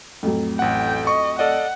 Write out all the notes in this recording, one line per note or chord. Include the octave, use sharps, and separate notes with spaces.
F2 A2 F#3
A1 F#5 G5
D#5 C#6
A4 D5 D#5 F#5